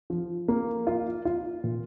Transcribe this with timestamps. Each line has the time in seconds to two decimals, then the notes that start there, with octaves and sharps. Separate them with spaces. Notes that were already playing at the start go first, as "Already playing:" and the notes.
0.10 F3
0.48 A#3
0.87 F4
1.25 F4
1.64 A#2